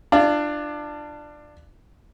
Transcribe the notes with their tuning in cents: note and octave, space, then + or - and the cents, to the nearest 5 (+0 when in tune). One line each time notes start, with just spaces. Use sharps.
D4 +15 F4 -30